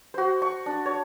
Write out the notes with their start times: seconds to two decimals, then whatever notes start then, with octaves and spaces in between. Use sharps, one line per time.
0.14 F#4 C5
0.42 C#6
0.66 D4
0.86 C#5